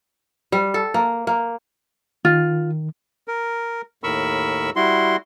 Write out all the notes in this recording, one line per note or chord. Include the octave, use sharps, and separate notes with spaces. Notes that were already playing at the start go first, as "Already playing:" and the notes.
G3
A4
A#3
A#3
D#3 F4
A#4
D#2 A2 A#4 B5 C#6 E6
G3 E4 F#4 C6